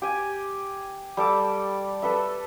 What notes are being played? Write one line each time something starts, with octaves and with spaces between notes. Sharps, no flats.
G4 G#5
G3 A4 D6
A4 B4 E5